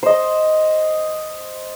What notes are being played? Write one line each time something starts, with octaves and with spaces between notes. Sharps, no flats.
C5 D#5